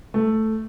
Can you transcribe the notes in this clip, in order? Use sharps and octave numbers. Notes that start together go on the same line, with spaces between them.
A3